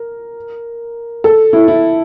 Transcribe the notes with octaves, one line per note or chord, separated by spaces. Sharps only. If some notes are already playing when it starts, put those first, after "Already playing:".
Already playing: A#4
A4
E4
E4